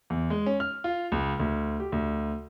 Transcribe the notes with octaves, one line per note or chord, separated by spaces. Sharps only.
E2
G#3
C#4
F6
F4
C#2
D2
G4
D2